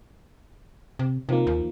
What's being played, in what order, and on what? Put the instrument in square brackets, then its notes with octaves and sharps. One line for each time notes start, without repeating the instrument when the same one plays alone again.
[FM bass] C3
[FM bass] C3 [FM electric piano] D#3 F3 A#3
[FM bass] D#2